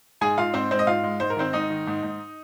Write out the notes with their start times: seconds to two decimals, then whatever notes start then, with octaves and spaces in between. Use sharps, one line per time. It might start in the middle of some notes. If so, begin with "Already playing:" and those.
0.21 G#2 G#4 G#5
0.38 G#2 F4 F5
0.54 G#2 C4 C5
0.71 G#3 C4 C5
0.79 D#5
0.87 G#2 F4 F5
1.04 G#3
1.20 G#2 C5
1.30 A#4
1.37 D#3 C4 C5
1.53 G#2 D#4 D#5
1.70 D#3
1.87 G#2
2.03 G#2